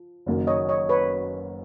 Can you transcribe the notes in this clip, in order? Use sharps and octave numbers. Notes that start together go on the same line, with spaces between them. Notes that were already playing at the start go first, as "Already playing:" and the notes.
Already playing: F3
F#1 F#2 D#3 F#3 A#3
C#5 D#5
C#5 D#5
B4 C#5